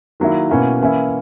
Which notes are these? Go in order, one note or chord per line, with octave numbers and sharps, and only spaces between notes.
D#3 F#3 A#3 E4
B2 A#3 C#4 E4
E3 A#3 C#4 E4